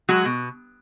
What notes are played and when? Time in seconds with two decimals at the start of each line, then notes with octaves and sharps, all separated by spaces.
0.09 F#3 G#3 F#4
0.25 B2